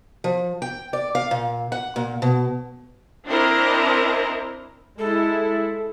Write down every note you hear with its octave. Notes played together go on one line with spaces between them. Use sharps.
F3
G5
D5
F5
A#2
F#5
A#2
B2
C4 D4 E4 A#4 D#5 A#5
G#3 E4 A4